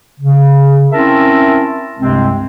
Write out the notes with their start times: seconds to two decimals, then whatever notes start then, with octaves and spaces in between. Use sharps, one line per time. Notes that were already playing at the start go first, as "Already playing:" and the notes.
0.20 C#3
0.92 C4 C#4 E4 A#4 E5 A5
1.99 C2 G2 C3 G#3 C4